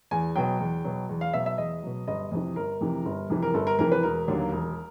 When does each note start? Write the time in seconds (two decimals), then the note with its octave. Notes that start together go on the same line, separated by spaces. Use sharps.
0.11 E2 G#5
0.36 B2 F#3 G5
0.60 E2
0.84 B2 F#3
1.09 E2
1.21 F5
1.33 B2 F#3 E5
1.46 E5
1.58 E2 D#5
1.83 B2 F#3
2.08 G1 D#5
2.32 F2 C3 E3
2.56 G1 A#4
2.81 F2 C3 E3
3.05 G1
3.30 F2 C3 E3
3.42 A#4
3.54 G1 A4
3.67 A#4
3.79 F2 C3 E3 A#4
3.92 B4
4.03 E1 A#4
4.28 D#2 D3 F#3 A#3
4.52 E1